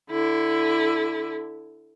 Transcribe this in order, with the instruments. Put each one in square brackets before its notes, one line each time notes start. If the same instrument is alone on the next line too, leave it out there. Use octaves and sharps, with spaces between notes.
[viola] D3 E4